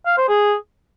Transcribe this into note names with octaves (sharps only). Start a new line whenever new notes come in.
F5
C5
G#4